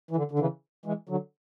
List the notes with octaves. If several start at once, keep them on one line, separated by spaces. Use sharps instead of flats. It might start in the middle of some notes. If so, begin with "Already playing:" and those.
E3
D3
D3
C#3 E3
E3 G#3
D3 F#3